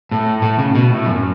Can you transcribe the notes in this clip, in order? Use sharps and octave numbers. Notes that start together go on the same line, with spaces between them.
A2
A2
C#3
B2
A2
F#2